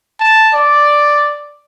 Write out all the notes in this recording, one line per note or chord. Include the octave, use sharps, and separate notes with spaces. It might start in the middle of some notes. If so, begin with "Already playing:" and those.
A5
D5